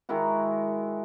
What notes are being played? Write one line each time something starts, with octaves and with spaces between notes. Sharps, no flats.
D#3 G#3 E4 F#4